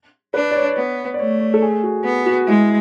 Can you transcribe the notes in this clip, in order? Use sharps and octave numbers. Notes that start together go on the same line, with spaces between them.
D4 B4
D5
C#5
B3
D5
A3 C#5
C#5
A4
G#4
F#4
B3
F#4
G#3 E4